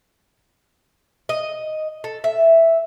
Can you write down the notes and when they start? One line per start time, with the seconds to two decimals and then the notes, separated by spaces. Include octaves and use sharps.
1.29 D#5
2.04 A4
2.24 E5